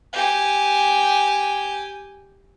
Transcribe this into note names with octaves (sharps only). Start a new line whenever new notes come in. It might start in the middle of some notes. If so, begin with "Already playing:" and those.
G4 G#5